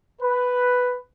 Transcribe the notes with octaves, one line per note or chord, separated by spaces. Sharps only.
B4